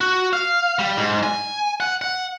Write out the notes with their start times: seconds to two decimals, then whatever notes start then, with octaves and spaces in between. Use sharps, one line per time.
0.01 F#4
0.33 F5
0.79 G3
0.97 G#2
1.23 G#5
1.80 F#5
2.02 F#5